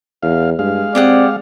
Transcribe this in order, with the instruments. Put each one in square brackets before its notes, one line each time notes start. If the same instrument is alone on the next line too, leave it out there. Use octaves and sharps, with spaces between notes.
[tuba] E2 [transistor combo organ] F5
[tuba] G2 [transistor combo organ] G#3 F5
[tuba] C4 [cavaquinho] G4 G#4 F#5 [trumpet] D5